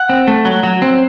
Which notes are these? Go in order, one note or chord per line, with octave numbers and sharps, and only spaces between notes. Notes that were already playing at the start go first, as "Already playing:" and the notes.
Already playing: F#5
C4
A3
F#3
F#3
C4